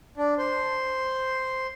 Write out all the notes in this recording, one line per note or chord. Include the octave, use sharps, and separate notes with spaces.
D4
C5